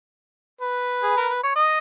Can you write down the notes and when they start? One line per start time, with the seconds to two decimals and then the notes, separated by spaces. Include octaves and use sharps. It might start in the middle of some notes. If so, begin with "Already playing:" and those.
0.61 B4
1.03 G#4
1.17 A#4
1.29 B4
1.43 C#5
1.56 D#5